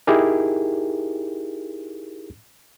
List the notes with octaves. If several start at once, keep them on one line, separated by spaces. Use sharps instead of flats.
D#4 E4 G4 G#4 A#4